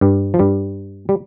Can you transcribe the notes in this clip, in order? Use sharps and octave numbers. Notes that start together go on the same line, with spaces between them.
G2 G3
F3
G2 G3
G3